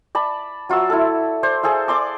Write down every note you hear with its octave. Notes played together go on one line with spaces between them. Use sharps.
D5 A5 B5
F#3 F4 F#4 E6
E4 A4
C5 D5
G#4 A4 C5 F5
D5 C6 D6